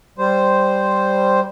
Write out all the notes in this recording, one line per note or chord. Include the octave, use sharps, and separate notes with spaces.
G3 C5